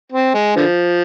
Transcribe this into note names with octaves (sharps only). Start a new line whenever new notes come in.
C4
G#3
D3 F3